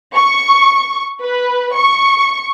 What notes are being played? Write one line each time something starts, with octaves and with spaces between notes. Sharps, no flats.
C#6
B4
C#6